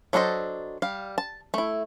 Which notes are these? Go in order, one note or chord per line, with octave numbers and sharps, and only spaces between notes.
F#3 D4 A4 C5 D#5
G3 F5
A5
A3 E4